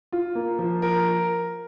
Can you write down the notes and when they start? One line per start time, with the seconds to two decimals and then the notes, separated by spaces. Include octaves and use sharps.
0.12 F4
0.35 A#3
0.59 F3
0.82 A#4